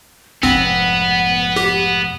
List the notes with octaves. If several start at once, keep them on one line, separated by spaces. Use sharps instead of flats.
F1 G#2 B3 C4 F#5
G4